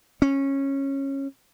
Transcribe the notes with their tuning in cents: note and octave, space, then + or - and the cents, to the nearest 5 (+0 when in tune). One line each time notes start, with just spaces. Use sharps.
C#4 -15